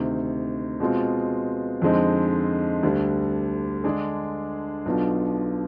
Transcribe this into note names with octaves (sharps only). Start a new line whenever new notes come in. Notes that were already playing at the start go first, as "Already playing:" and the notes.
Already playing: D2 C3 D#3
B2 G#3 C4 F4
F2 D3 G#3 C4 D#4
D2 D3 G3
D3 G#3 D4 G#4
B1 B2 B3 D4 F4